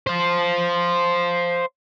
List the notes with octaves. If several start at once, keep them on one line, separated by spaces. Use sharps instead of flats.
C5 F5